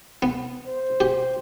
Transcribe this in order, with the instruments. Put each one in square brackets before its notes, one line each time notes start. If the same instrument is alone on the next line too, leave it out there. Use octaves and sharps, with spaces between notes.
[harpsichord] B3
[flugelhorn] C5
[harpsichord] G4